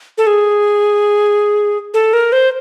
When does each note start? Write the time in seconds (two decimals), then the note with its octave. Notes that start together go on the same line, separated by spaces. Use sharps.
0.18 A4
0.27 G#4
1.94 A4
2.13 A#4
2.32 C5